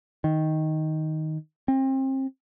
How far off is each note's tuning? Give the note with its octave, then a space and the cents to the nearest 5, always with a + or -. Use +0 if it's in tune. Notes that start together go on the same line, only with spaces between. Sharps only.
D#3 +5
C4 +30